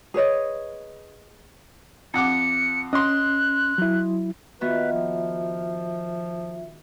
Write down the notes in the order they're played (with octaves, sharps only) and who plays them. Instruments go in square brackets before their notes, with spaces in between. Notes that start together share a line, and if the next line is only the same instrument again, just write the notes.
[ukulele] G#4 B4 C#5 D#5
[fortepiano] F2 F#5 D6 [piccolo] C#7
[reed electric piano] C#4 [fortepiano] D#5 C6 [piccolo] F#6
[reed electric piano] F#3 E4
[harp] D#3 B3 F#4 [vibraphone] F4 E5 [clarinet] B4
[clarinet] F3